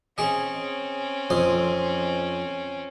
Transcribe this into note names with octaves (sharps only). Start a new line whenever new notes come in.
C4 C#4 G#4 D#5
F2 C5 D#6